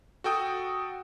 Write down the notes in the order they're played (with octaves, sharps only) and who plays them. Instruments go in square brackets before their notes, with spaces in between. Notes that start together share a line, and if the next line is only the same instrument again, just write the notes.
[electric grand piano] F#4 A4 G5 D#6